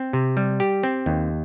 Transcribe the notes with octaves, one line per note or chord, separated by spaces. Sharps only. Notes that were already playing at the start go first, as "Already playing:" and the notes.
Already playing: C4
C3
G3
G4
C4
D#2